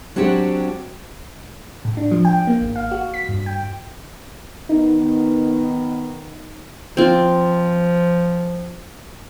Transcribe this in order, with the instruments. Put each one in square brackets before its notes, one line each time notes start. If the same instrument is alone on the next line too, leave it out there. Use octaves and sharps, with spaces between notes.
[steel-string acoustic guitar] F#3 C4 D4 F#4 G4
[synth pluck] A2
D4
F3
G5
A#3
G#1
F5
F#4
B6
G2
G5
[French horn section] D#3 B3 [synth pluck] D#4
[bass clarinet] F3 [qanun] C4 F4